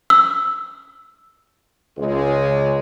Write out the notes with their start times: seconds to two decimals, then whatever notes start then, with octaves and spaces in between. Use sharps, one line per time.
0.10 E6
1.97 C#2 G#3